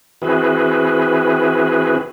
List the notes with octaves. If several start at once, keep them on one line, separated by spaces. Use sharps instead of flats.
E3 C4 E4 F#4 G#4 B4